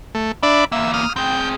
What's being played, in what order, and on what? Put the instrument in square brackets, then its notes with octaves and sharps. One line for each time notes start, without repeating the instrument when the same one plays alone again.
[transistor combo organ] A3
[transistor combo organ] D4 D5 E5 [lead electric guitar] B5
[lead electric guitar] E2 A#3 [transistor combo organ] E5
[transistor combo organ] D#6 F6
[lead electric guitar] C4 G#4 [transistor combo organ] G5